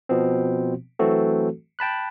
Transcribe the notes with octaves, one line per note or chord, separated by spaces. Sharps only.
B2 F3 B3 C4
E3 F#3 A3 C4 F#4 A4
G5 A5 B5 F#6